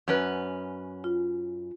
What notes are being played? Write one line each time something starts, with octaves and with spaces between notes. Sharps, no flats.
F#2 C#4 B4
F4